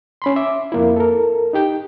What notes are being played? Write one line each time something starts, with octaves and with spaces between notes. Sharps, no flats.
C#4 B5 C6
E5 D6
F2 A#3 E4
A4 A#4
D#4 G4 G5